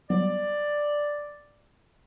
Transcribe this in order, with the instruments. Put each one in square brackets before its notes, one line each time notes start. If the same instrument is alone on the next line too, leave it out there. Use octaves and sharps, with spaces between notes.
[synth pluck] F#3 G3 B3 [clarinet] D5